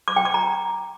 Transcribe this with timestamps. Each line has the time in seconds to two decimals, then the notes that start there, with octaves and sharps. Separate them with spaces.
0.08 D6
0.16 G5
0.25 D6
0.34 A#5